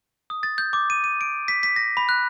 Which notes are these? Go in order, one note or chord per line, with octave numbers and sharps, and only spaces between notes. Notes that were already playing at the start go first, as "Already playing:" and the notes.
D#6
A6
G6
D6
D#7
D#7
D7
B6
B6
A#6
B5
F#6